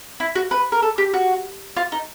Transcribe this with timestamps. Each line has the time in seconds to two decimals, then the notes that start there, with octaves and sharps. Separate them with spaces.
0.20 E4
0.35 F#4
0.51 B4
0.72 A#4
0.82 A4
0.98 G4
1.14 F#4
1.77 F4
1.92 D#4